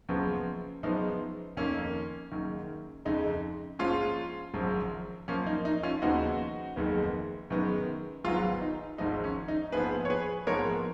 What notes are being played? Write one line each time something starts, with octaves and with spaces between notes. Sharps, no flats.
F#1 F#2 C#3 F3 B3
F#2 F3 G#3 B3 D#4
F2 D#3 A#3 C#4
F#1 F#2 D#3
F2 C#3 G#3 D#4
A#1 G#2 F3 G#3 C#4 F4
G#1 F#2 C#3 F3
F#2 F3 A#3 C#4
D#4
D#4
C#4 F4
D#2 C#3 F3 G#3 B3 D#4 F#4
F#1 F2 D#3 G#3 B3
F#2 D#3 G#3 B3
G#1 G#2 F#3 B3 F4 G#4
D#4
G#1 G#2 F3 G#3 D#4
C#4
D#4
A#1 G#2 F3 B3 G#4 B4
C#5
G#4 B4
A#1 G#2 F3 G#3 B3 A#4 C#5